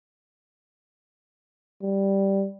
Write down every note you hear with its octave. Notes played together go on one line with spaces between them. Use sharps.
G3